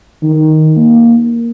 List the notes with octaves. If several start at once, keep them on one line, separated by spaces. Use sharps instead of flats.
D#3
A#3